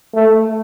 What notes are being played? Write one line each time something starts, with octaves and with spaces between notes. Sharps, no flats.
A3